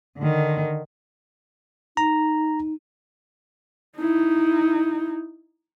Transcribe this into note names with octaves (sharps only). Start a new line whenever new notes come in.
D3 D#3
D#4 A#5
D#4 E4